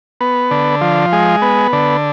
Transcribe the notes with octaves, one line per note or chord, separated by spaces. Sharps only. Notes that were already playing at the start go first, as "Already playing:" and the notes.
B3
D3
F3
G#3
B3
D3